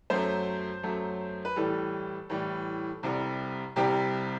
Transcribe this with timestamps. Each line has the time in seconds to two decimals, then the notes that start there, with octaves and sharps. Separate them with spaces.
0.10 F#2 F#3 A3 C5
0.83 F#2 F#3 A3
1.45 B4
1.56 A2 E3 G3 A4
2.30 A2 E3 G3
3.03 C2 C3 G3
3.76 C2 C3 G3 G4